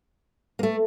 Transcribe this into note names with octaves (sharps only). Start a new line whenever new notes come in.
A#3
A3